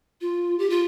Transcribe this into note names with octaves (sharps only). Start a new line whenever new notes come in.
F4
G4
F4